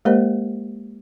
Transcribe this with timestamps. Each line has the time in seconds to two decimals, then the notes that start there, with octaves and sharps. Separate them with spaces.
0.05 G#3 A#3 G4 A#4 C5 D#5